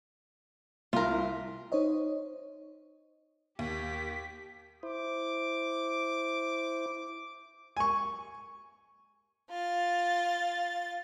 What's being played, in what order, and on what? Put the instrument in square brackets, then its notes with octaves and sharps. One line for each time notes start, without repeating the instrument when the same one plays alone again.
[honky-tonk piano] C2 [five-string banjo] F4 A#4
[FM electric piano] D#4 C5 C#5 D#5
[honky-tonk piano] D#2 [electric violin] G4 B6
[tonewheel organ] E4 C5 [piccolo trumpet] D6
[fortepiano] G#5 C#6
[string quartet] F4 A6